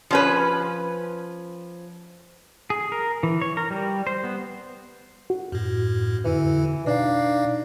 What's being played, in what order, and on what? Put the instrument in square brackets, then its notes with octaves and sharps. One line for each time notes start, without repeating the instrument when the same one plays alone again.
[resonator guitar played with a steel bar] F3 C#4 B4
[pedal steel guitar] G#4
A#4
E3
C#5
A#4
G3
C5
B3
[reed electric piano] F#4
[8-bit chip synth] F#2 A2
[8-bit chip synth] F2 D3 E4 [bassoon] E3
[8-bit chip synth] B2 D#4 F5 [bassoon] D4